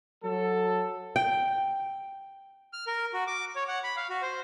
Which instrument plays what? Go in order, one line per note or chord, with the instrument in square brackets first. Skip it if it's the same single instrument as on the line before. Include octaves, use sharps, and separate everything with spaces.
[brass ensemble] F#3 A4
[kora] G5
[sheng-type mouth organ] F6
A#4
F#4
D6
C#5
F#5
B5
F5
F#4
C5